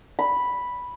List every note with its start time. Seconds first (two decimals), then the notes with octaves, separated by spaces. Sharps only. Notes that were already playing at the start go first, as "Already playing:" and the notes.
0.19 B5